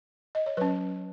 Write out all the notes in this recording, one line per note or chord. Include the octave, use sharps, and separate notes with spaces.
D#5
C#5
F#3 C#4 B4